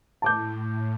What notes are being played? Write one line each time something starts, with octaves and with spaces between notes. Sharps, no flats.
A2 A5 D6 G6